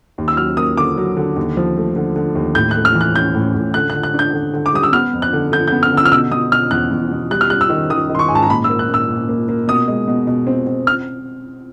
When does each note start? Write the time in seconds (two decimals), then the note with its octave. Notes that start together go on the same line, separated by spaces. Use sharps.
0.18 D#2
0.28 E6
0.37 F#3 F6
0.57 A#3 D#6
0.77 D3 D6
0.97 F#3
1.17 D3
1.36 D#2
1.57 F3
1.77 A3
1.96 D3
2.16 D3
2.35 D#2
2.55 A2 G6
2.71 F#6
2.76 A3
2.85 F6
2.95 E3
3.01 F#6
3.15 C#4 G6
3.35 A2
3.54 A2
3.74 D3 F#6
3.90 F#6
3.95 D3
4.03 F#6
4.14 D4 G6
4.33 D3
4.54 D3
4.66 D6
4.73 G3 D#6
4.83 E6
4.92 B3 F6
5.13 F2
5.22 F#6
5.33 D3
5.52 D3 G6
5.68 G6
5.72 B3
5.83 F6
5.92 D3
5.97 E6
6.05 F6
6.12 B2 E6
6.31 B2 D#6
6.52 B2 F6
6.71 E2 F#6
6.91 E2
7.11 B2
7.30 G3 F#6
7.41 F6
7.50 G3 F#6
7.61 E6
7.70 D#3
7.90 D#3 D#6
8.10 D#3
8.15 C6
8.19 C#6
8.28 G#2 G#5
8.35 A5
8.42 A#5
8.50 A#2 B5
8.64 E6
8.69 A#3
8.79 F#6
8.89 A#2 E6
9.09 A#2
9.29 A#3
9.49 A#3
9.68 B2 D#6
9.88 G#3
10.08 B2
10.27 B2
10.47 C4
10.67 C4
10.87 F6